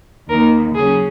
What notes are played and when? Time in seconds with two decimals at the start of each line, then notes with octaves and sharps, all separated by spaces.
0.29 D#2 D#3 A#3 A#4
0.75 C#3 F#3 C#4 G#4